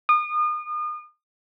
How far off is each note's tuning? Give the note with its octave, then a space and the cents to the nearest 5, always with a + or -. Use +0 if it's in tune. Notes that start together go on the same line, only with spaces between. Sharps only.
D#6 -35